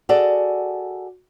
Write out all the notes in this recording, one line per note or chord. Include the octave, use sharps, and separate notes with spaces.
F#4 G#4 A4 D5